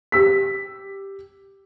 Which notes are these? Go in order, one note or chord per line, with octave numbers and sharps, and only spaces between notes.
G4 E6 B6